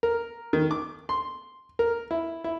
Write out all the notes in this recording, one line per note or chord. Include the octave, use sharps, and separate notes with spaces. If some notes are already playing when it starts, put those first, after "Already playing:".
A#4
D#3
D6
C6
A#4
E4
E4